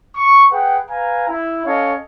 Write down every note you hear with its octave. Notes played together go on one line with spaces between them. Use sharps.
C#6
G#4 B4 F#5 G5
B4 F5 G#5 A#5
E4
C#4 A4 C#5 D#5 F5